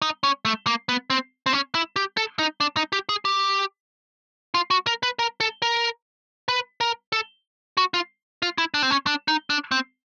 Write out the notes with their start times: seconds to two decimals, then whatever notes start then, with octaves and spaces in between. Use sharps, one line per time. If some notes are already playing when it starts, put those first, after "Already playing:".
0.02 D#4
0.23 C#4
0.45 A3
0.67 A#3
0.89 B3
1.10 C4
1.46 C4
1.53 C#4
1.75 E4
1.96 G4
2.17 A4
2.39 D#4
2.60 D4
2.77 D#4
2.93 G4
3.09 G#4
3.25 G4
4.54 F4
4.70 F#4
4.87 A#4
5.03 B4
5.19 A#4
5.40 A4
5.62 A#4
6.48 B4
6.81 A#4
7.12 A4
7.77 F#4
7.94 F4
8.42 F4
8.58 E4
8.74 D4
8.83 C4
8.91 C#4
9.07 D4
9.28 D#4
9.50 D4
9.71 C4